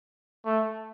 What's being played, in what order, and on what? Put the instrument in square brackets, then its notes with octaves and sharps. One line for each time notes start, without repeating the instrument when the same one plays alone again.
[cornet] A3